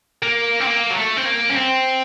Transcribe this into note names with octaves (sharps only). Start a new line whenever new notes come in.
A#3
C4
A#3
F#3
A3
C4
A#3
C#4
C4